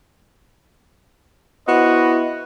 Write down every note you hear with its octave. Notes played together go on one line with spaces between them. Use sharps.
B3 E4 F#4 C5 D#5